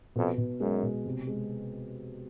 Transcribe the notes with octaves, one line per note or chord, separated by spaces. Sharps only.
F2 B2
B2
F#2 G#3
B2
C3
G#3